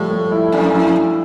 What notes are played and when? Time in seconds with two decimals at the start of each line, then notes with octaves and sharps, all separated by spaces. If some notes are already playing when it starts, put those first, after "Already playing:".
Already playing: A2 F3 G3 A3
0.11 A3
0.32 E4
0.46 E4
0.52 F2 D4
0.74 E4